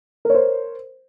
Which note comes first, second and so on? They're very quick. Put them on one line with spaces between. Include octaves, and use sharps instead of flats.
A#4 C#5 C5